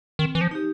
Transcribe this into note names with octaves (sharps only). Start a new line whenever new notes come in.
D#3 C4
E3
F3
D#4 G4